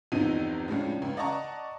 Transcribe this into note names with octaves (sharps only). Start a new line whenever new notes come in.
G1 E2 C3 F3 D#4 D#7
A2 C#3 F3 G#3 C#4 D4
C#2 C#3
D5 D#5 F#5 A5 A#5 C#6